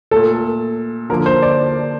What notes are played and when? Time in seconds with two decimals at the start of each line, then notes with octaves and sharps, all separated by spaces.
0.11 A#2 A3 A4
1.10 D3 F3 A#3 A#4
1.26 C5
1.42 D5